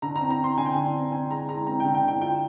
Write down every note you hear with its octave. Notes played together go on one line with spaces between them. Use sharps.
D3 A#5
A#5
C4
A#5
C4
C6
D3 G#5
G5
D3 G#5
C4
C4 G#5
G#3 A#5
G#3 A#5
C4 A#5
G5
D3
G5
D3
G5
F4 G5